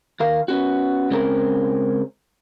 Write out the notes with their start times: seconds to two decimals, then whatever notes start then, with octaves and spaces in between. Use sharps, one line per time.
0.20 D#3 A#4 F5
0.48 B3 C#4 F#4
1.10 C#3 G#3 C4 C#4 F#4 A#4